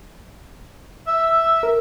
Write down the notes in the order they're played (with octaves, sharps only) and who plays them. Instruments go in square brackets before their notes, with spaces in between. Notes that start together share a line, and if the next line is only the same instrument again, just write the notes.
[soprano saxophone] E5 [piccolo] E6
[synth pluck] A#4